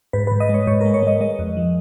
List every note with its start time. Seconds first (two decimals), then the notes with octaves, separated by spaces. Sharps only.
0.13 G#2 B4
0.27 B4
0.32 G#2
0.40 D#5
0.49 G#3 C#5
0.67 G#2 C#5
0.81 G#3 A#4
0.94 C#5
1.03 G#3 D#5
1.21 G#3 D#5
1.39 F2
1.57 F3